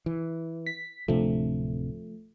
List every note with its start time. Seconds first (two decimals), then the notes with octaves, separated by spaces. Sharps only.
0.06 E3
0.66 B6
1.08 D1 C3 F3 A3 D4